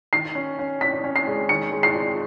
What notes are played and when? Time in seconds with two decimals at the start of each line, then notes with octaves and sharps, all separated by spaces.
0.13 D#3 C7
0.35 C#4
0.59 C#4
0.81 C#4 B6
1.04 C#4
1.16 C7
1.27 G#3
1.49 D#3 C#7
1.72 G#3
1.83 C7
1.95 F4